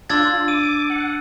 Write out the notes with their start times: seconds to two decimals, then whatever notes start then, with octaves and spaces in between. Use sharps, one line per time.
0.10 D4 F4 E6 G#6 A6
0.48 D6 D#7
0.90 F#5